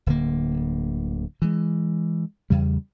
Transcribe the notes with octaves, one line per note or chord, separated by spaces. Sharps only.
D1 D3 A#3
E3 G#3
E2 C#3 G3